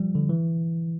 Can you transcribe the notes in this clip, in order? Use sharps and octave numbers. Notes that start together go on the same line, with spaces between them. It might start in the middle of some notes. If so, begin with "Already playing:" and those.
Already playing: F3 G3
D3
E3